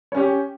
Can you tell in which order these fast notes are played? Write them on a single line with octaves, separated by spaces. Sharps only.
C#5 C#4 G4